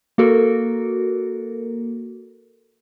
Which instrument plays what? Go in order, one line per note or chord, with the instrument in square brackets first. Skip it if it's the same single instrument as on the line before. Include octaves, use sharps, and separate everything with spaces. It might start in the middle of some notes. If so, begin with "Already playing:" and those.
[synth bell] A#3 F#4 A4 A#4